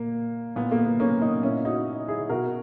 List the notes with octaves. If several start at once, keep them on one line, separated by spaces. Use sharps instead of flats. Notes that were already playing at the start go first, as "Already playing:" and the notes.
Already playing: A#2 A#3
A#2 B3
A#3
B3
A#3 C#4
B3 D#4
A#2 C#4 E4
D#4 F#4
E4 G#4
B2 F#4 A#4